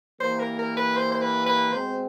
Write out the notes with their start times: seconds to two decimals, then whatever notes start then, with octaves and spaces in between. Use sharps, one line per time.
0.20 E3 G3 A#3 C5
0.40 A#4
0.59 A#4
0.77 B4
0.97 C5
1.12 C5
1.22 B4
1.46 B4
1.72 B2 G#3 C4 C5